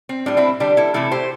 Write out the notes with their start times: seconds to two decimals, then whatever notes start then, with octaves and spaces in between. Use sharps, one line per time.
0.09 C4
0.26 A2 G3 D4
0.37 C4 E4
0.60 D3 G3 D4 G4
0.77 E4 A4
0.94 C3 E3 A3 E4 A4
1.11 G4 C5